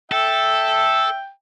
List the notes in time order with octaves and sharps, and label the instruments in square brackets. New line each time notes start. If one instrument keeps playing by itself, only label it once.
[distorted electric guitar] A4 [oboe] E5 [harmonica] G5